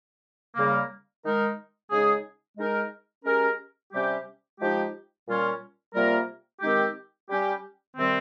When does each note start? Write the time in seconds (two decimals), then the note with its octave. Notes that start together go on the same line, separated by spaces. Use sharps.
0.55 C#3 G3 A#3
1.23 D#3 G#3 D#4 A#4
1.90 C#3 G#3 D#4 G#4
2.58 G#3 D#4 A#4
3.24 G#3 C#4 G4 A#4
3.92 C3 G3 C#4 G4
4.59 F3 G#3 D#4 G4
5.27 A#2 G3 C#4 F4
5.94 C3 G3 A#3 F4 A#4
6.61 D#3 G#3 C4 D#4 G4
7.29 G3 C#4 G4
7.96 C3 D#3 G3 C4